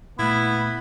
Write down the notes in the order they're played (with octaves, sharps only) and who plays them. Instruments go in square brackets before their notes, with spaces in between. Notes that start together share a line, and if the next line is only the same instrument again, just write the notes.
[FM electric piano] A#2 A3 [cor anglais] B3 [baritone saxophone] E4 [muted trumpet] B5